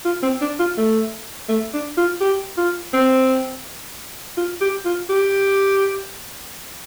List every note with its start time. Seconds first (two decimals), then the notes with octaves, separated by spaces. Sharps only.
0.05 F4
0.23 C4
0.42 D4
0.59 F4
0.78 A3
1.49 A3
1.74 D4
1.97 F4
2.21 G4
2.58 F4
2.94 C4
4.37 F4
4.61 G4
4.85 F4
5.10 G4